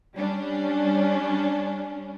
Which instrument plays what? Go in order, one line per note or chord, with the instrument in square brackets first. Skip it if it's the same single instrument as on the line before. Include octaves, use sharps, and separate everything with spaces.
[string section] G3 C#4 D4